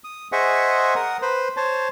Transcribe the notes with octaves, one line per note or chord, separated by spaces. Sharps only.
D#6
G#4 C5 D#5 E5 F#5 C#6
A#4 F#5 D#6
B4 C5
C5 C#5 A5